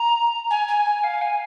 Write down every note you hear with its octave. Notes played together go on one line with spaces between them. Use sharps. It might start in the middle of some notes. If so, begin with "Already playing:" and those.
Already playing: A#5
G#5
G#5
G#5
F5
G#5